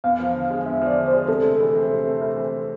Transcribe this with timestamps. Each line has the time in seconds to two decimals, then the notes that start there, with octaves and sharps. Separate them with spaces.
0.04 E2 F5
0.20 F3
0.35 D3
0.50 G#3
0.66 E2 E5
0.81 F3 D5
0.98 D3
1.08 G#3 C5
1.28 C3 A4
1.44 A3
1.60 E3
1.75 C4
1.91 C3
2.06 A3
2.22 E3
2.37 C4